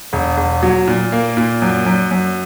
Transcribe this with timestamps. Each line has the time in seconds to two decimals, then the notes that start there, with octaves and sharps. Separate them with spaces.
0.13 E1
0.37 E1
0.63 F#3
0.88 A#2
1.12 A#3
1.37 A#2
1.62 F#2
1.86 F#2
2.11 F#2